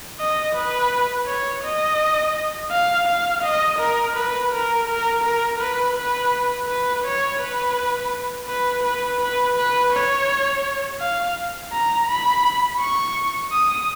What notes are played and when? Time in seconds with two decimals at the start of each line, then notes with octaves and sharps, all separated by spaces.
0.20 D#5
0.56 B4
1.27 C#5
1.64 D#5
2.72 F5
3.07 F5
3.44 D#5
3.79 A#4
4.16 B4
4.52 A#4
4.88 A#4
5.24 A#4
5.61 B4
5.96 B4
6.68 B4
7.05 C#5
7.40 B4
8.49 B4
8.84 B4
9.21 B4
9.57 B4
9.93 C#5
11.01 F5
11.73 A#5
12.09 B5
12.80 C#6
13.52 D#6